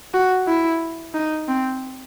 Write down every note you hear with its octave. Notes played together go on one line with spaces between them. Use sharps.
F#4
E4
D#4
C4